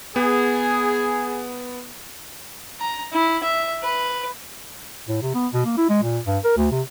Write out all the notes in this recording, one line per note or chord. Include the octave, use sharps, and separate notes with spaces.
B3 G#4
A#5
E4
E5
B4
A2
C3
B3
B2
A#3
E4
G#3
A#2
G2
A#4
D2
C3